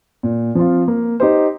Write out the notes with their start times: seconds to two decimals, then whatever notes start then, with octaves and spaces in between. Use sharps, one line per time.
0.23 A#2
0.55 F3 C4 F4
0.88 A#3
1.20 D#4 G4 C5